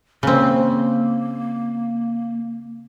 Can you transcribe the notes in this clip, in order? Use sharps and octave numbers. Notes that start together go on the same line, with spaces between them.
C#3 A#3 C4